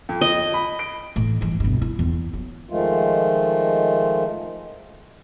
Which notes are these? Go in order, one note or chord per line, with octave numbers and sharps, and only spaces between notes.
F2
D#5
B5
D7
A2 E3
G2 E3
B1 G2
E4
E2
F#3
D#3 F3 G#3 A3 F4